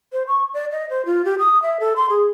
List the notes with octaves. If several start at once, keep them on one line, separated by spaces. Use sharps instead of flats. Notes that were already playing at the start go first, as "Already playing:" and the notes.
C5
C#6
D5
D#5
C5
F4
G4
D#6
E5
A4
C6
G#4